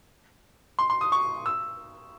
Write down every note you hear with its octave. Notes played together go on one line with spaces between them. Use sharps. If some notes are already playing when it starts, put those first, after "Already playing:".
C6
C6
D#6
C#6
E6